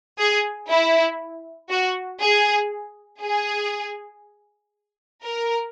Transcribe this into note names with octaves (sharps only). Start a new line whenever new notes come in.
G#4
E4
F#4
G#4
G#4
A#4